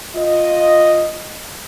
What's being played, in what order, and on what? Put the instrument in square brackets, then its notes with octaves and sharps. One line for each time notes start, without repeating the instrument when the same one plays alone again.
[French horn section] F4 D#5